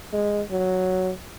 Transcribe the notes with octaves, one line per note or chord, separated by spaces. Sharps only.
G#3
F#3